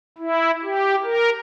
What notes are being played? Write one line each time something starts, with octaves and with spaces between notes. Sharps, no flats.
E4
G4
A#4